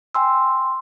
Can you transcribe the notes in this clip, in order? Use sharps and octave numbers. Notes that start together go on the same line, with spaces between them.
G5 G#5 C6 E6